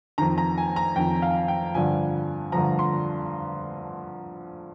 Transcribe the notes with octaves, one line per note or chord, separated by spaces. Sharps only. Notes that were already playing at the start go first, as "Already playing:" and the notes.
F2 D#3 A#5
A#5
G#5
A#5
F2 D#3 G5
F5
G5
G2 D3 F3 G#5
G2 D3 F3 A#5
C6